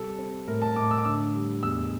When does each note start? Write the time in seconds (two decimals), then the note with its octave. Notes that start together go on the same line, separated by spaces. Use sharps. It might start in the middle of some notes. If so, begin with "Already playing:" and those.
Already playing: C3 G3 A4
0.19 C4
0.47 A2 A#4
0.62 A5
0.76 A2 D6
0.91 E6
0.98 D6
1.05 D3 E6
1.34 G3
1.63 E2 E6